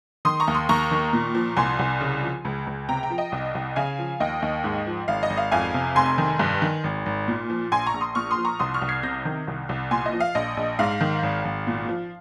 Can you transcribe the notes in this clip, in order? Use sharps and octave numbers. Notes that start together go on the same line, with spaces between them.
D#3 C6 D#6
A#5 C#6
D#2
C6 D#6
D#2 A#5 C#6
D#3
A#2
F3
C2 G#5 C6
C2
C#3
F3
C#2
C#2
C3 G5 A#5
G5 A#5
F3
D#5 G5
C2
C2
C#3 F5 G#5
F3
D#2 D#5 G5
D#2
G#2
F3
G#1 F5
D#5
G#1
F5
F2 F5 G#5
C3
F1 G#5 C6
D#3
G2
D#3
G#1
G#1
A#2
F3
A#1 G#5 C6
A#5 C#6
A#1
C6 D#6
A#2 C#6 F6
C6 D#6
F3
A#5 C#6
C2 C6 D#6
C#6 F6
C2
G#6 C7
C3 G6 A#6
D#3
C2
C2
A#2 G#5 C6
D#5
F3
F5
A#1 D#5
A#1
G#2 F5
D#3
G#1
G#1
A#2
F3